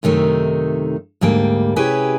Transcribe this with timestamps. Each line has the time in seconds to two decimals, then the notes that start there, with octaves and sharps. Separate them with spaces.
0.03 F#2 C3 D#3 A3 D#4
1.21 D2 G#2 G3 A#3 G5
1.76 C3 C#4 E4 G4 G#4 B4